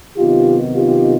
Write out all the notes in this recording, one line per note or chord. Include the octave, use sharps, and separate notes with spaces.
C3 D#3 F#3 B3 D#4 F4 G4
F4 G4